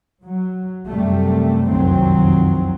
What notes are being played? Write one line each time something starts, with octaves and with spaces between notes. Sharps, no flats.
F#3
F#2 C3 G3 A3
F1 C2 F#2 D#3 F#3 C4